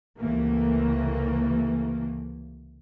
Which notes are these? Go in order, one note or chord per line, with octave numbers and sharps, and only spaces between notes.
C#2 C3 E3 A3 A#3